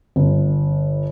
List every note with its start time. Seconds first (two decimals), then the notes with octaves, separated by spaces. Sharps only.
0.16 G1